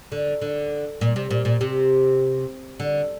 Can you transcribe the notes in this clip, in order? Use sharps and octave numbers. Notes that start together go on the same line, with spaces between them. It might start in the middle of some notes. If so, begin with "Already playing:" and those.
D3
D3
A#2
C3
A#2
A#2
C3
D3